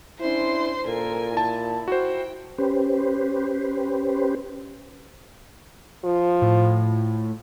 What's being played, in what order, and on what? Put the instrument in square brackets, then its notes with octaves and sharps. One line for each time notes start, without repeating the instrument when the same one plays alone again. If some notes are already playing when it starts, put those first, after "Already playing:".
[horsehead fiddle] C#4 D4 [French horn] E4 [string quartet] C5 C6
[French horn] A#2 [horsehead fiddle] A4 A#4 [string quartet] G#5
[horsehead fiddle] E4 [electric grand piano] A5
[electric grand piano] F#4 C5 [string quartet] G5
[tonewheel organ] C#4 G4 B4 C5
[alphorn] F3
[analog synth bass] A2